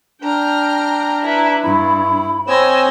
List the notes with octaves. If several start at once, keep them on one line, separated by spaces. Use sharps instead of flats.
D4 G5 A#5 F6
E4 B4 A#5
G2 E4 B5
C4 C5 C#5 D#5 G#5 E6